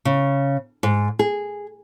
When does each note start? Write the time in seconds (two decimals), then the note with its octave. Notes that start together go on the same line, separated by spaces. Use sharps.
0.05 C#3
0.83 G#2
1.19 G#4